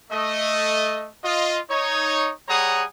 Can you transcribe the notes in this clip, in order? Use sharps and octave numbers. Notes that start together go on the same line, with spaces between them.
A3 D#5
F4 D#5
D#4 C#5
G3 G#4 C#5 F#5 A#5 D#6